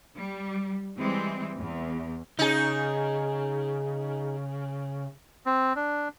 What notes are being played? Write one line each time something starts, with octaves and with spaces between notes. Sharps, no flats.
G3
E3 G3 G#3 C4
E2
C#3 D#4 G#4
C4
D4